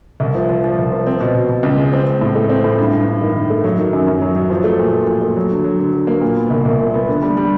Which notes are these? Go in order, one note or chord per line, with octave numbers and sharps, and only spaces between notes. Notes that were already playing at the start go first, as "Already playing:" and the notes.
C2
F3
F3
F3
C2
F3
C4
B2
B2
B2
C#2
G#3
C4
C4
A2
A3
C4
A2
G2
G2
G2
D#3
D#3
A3
F#3
D#3
F#2
F#2
F#3
F#3
F3
A3
A#2
F3
A#2
A3
F#3
D3
F#3
D3
D3
A#3
A#2
B3
C2
C2
A#2
B3
D3
G3
G3